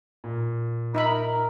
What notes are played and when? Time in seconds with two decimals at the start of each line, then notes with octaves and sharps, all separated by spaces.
0.24 A#2
0.95 D#4 A#4 E5 B5